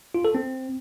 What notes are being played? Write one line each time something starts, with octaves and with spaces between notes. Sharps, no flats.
F4
A4
C4